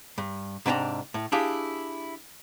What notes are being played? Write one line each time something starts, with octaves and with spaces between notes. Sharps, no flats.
G2
G#2 C3 D4 B4 G5 A#5
A2
D4 E4 G4 G#4 F5